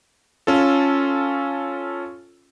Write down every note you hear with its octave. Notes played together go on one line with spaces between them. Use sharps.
C#4 F4 A4